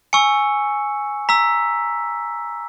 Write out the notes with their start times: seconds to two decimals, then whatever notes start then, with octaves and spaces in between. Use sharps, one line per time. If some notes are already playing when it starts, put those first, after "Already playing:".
0.13 G#5 C#6 E6 C#7
1.29 A#5 E6 B6